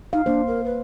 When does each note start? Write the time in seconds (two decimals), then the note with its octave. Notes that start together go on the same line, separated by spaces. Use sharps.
0.13 D#4 F5
0.26 A#3 D4 C5
0.47 A#4
0.64 B4